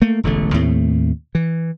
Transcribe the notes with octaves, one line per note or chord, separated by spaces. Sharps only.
A3 A#3
E1 A1 D3 A3
D#2 A2 A3 C4
E3